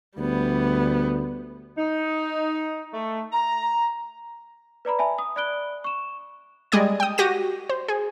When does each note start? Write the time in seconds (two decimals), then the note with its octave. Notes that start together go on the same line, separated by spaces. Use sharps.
0.18 D2 G3 B3
1.78 D#4
2.93 A3
3.32 A#5
4.85 B4 D5 A#5 B5
4.99 E5 G#5 A5 B5
5.18 D#6
5.36 D5 B5 F#6 D7 G7
5.84 C#6 E7
6.72 G3 G#3 D5 D#5 G#6
7.00 G5 D#6
7.18 F#4 G4 A#6 D#7
7.69 C5
7.88 G#4